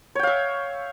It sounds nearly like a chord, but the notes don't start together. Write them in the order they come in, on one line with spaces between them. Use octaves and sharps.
C#5 G5 F5 E5